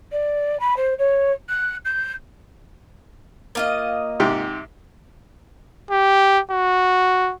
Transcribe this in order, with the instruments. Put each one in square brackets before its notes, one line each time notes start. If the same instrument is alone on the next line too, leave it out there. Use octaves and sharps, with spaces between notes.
[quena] D5
B5
C5
C#5
F#6
G6
[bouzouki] A#3 F4 D#5
[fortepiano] G#2 C3 G4
[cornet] G4
F#4